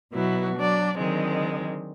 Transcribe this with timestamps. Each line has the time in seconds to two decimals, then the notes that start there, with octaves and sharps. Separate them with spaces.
0.12 B2 F#3 B3 E4 F#4
0.55 F#3 D4 D5
0.97 D3 D#3 F#3 G#3 C4